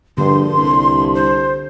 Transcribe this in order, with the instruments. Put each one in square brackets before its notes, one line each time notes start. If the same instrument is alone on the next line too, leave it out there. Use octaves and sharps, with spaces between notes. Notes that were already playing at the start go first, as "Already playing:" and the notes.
[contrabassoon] A#1 [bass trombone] G2 [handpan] D3 [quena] C6
[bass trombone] C2 [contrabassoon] G2
[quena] C5